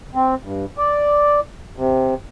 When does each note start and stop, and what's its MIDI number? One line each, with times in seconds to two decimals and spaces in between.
0.15 0.35 60
0.44 0.65 43
0.78 1.40 74
1.77 2.14 48